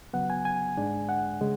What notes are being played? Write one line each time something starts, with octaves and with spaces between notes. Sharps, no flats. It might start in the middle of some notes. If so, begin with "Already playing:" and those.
C#3 F#3 B3 F#5
G#5
G#5
G#2 G#3 D4
F#5
C#3 G#3